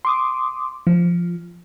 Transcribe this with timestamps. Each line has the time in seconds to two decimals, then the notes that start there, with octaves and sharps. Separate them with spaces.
0.05 C6 D6 D#6
0.87 F3